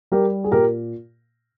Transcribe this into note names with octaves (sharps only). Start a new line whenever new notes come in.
G3 G4 A#4
G#4
A#2 G4 A#4